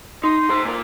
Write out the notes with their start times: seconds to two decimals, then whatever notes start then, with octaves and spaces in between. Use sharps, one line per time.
0.24 D#4 C6
0.50 C5 A#5
0.65 A#2 A#4